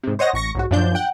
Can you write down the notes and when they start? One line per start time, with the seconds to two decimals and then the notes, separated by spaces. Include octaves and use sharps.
0.03 G#2 C3
0.19 C5 C#5 D#5 F#5 A#6
0.33 A1 C#6 A#6 C#7
0.55 B1 G#2 F#4
0.71 F#2 A#2 F3 D4 G6
0.95 F#5 G5